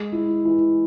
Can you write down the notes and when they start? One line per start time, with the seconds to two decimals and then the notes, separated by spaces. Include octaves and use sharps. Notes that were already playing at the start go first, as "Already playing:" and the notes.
Already playing: G#3
0.13 E4
0.45 E3